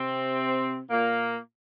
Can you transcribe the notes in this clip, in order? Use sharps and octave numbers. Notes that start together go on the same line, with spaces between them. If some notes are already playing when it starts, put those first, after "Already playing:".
Already playing: C3 C4
A#2 A#3